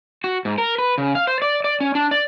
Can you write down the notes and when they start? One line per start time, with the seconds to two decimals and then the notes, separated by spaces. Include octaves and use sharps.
0.24 F#4
0.45 G#2
0.58 A#4
0.78 B4
0.98 C#3
1.15 F5
1.27 C5
1.42 D5
1.64 D5
1.80 C#4
1.95 D4
2.11 D5